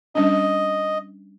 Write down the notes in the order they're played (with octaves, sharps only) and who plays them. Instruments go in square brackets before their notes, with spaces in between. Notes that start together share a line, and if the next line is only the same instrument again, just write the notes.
[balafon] G3 C#4 D4 [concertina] D#5